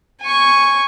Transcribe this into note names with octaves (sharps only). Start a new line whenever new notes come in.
G#5 C#6